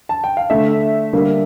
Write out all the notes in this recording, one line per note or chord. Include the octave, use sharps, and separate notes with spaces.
A5
G5
F5
D3 A3 E5
D3 G3 A#3